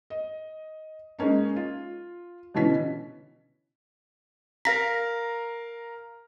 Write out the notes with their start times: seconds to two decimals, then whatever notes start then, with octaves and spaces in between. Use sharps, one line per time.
0.10 D#5
1.19 G#3 A#3 C#4 D#4
1.56 F4
2.54 B2 D3 E3 C#4 B6
4.65 A#4 F5 A#5 A#6 B6